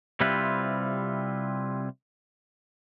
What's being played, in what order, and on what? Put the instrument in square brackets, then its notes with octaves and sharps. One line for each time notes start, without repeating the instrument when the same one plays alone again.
[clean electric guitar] C3 G3 C4 E4 F4 B4